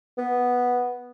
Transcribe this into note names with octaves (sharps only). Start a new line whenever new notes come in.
B3